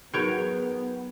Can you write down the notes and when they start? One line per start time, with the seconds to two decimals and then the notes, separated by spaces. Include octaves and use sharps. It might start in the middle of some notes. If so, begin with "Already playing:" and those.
0.14 F#3 B3 D#4 G#4 A#4 C#5 G5